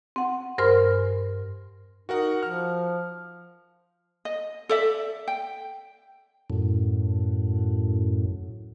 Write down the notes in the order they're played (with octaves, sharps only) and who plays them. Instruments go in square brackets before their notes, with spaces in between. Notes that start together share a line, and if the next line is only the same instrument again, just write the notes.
[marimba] C4 F#5
G2 A#4 C5 G#5 C6 F6
[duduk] D#4 [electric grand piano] F#4 A#4 F#5
[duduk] F3 [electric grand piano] F6
[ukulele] D#5
A4 D5 E5
G5
[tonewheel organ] F#2 A2